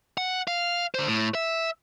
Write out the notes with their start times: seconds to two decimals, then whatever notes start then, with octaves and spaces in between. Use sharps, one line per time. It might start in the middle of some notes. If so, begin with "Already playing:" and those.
0.18 F#5
0.48 F5
0.95 D3 C5
1.07 A2
1.35 E5